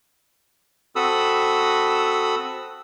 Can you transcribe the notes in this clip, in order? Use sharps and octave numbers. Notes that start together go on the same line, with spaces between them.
C4 F#4 A4 B5 D#6 E6